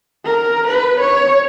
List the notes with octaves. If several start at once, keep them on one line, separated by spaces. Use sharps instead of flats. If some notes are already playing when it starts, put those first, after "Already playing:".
A#4
B4
C#5